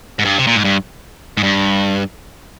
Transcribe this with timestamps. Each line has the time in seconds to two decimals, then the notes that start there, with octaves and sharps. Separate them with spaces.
0.19 G#2
0.25 G2
0.38 C3
0.47 A#2
0.56 G#2
0.64 G2
1.37 G#2
1.43 G2